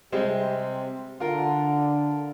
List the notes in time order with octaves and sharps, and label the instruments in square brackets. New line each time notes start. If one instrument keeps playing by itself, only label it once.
[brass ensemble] C3 [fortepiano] G3 G#3 C4
[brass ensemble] D3 [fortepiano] F4 A#4